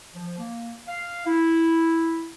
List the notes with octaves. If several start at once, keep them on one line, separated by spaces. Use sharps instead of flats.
F3
A#3
F5
E4